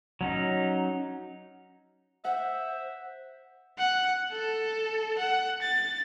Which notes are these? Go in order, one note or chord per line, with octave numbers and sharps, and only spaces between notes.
F#3 C#4 D#4
C5 E5 F#5
F#5
A4
F#5
A6